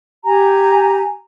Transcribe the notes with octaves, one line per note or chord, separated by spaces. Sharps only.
G4 G#5 A#5